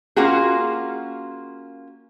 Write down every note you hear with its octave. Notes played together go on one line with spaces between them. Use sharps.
A#3 C#4 F4 F#4 G#4